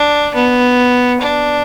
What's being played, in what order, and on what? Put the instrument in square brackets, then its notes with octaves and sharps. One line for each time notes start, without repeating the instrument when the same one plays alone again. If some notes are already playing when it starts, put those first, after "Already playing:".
Already playing: [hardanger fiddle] D4
B3
D4